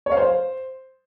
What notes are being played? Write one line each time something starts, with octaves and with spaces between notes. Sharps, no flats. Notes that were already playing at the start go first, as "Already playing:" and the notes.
C#5
F5
C5